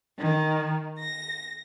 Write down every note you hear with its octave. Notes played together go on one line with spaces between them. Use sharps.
D#3
A#6